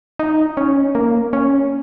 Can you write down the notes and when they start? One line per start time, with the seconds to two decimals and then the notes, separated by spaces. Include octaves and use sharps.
0.19 D#4
0.57 C#4
0.95 A#3
1.33 C#4